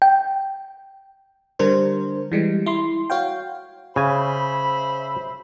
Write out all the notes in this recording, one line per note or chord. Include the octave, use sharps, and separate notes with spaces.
G5
D3 G3 D4 A#4 C5
E3 G3 G#3
E4 C6
F#4 C#5 F5 G5
C#3 C5 E5 G#5 B5